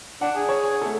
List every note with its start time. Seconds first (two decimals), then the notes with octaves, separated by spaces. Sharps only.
0.21 D4 F#5
0.36 G#4
0.49 C#5
0.82 A3 A4